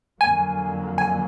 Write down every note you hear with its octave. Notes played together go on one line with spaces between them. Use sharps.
F2 D3 F#3 A#3 G#5
G#5